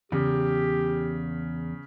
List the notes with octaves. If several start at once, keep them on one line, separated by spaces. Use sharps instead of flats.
E2 C#3 G4